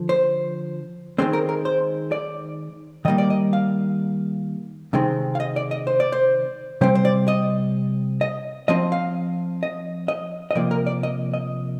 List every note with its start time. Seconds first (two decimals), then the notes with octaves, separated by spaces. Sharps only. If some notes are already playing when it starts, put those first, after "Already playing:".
Already playing: D3 F3
0.09 C5
1.18 D#3 G#3 C4 C5
1.33 A#4
1.49 A#4
1.65 C5
2.12 D5
3.05 D#3 G3 A#3 D#5
3.18 D5
3.30 D#5
3.53 F5
4.93 C3 D#3 G#3 C4
5.35 F5
5.40 D#5
5.56 D5
5.71 D#5
5.87 C5
6.00 D5
6.12 C5
6.81 C3 G3 C4 C5
6.95 C5
7.05 D5
7.28 D#5
8.21 D#5
8.68 F3 C4 D#5
8.92 F5
9.63 D#5
10.08 D#5
10.51 D#5
10.55 C3 F3 A#3 D5
10.71 A#4
10.87 D5
11.03 D#5
11.34 D#5